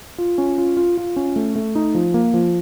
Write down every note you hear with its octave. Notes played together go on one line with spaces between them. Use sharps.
F4
C#4
F4
F4
F4
C#4
A3
A3
D#4
F3
A#3
F3